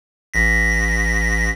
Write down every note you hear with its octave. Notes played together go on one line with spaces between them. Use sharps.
A1 A#6 B6